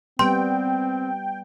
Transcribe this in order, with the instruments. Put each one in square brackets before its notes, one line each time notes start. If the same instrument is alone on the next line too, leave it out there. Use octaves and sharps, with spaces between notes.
[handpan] G3 B3 [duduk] C4 [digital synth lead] G5 [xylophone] C6